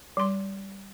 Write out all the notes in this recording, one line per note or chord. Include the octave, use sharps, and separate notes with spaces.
G3 C6